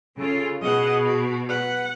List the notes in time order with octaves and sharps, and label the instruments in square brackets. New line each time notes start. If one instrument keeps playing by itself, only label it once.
[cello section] C#3 F4 [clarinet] A4
[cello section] B2 [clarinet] G#4 [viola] D#5 F#5
[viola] F#4
[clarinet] B4 [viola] F#5